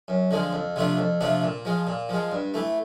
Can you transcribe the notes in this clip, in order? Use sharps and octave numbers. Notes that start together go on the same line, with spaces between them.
F#2
D3 F3 G#3
F2
C3 F3 A3 D4
F2
C3 F3 A3 D4
A#2
F3 G#3
A#2
F3 G#3
G2
E3 A3